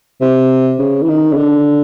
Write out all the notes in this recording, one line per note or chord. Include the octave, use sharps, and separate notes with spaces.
C3
C#3
E3
D#3
C#3
D3